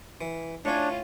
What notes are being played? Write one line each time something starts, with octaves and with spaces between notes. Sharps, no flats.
E3
A2 C#4 D4 F4 C#5